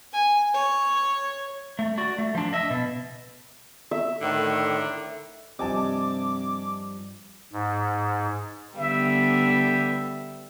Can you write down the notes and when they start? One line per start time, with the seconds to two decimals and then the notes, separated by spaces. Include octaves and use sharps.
0.13 G#5
0.54 C#5
1.79 A3
1.98 F#4 D5
2.18 A3
2.35 F3 D4
2.53 D#5 E5
2.70 B2
3.91 E5
4.21 A2 D3 D#3
5.59 G2 C3 F3 G3 D#5 G#5 A5 D6
7.53 G#2
8.77 D3 G3 B3 E5